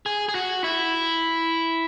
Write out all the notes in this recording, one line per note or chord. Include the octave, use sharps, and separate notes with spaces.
G#4
G#4
F#4
E4